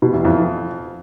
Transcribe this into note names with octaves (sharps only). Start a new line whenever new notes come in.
B2
E2
F2